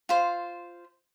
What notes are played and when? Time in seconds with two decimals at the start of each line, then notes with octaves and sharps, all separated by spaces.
0.09 F4 C5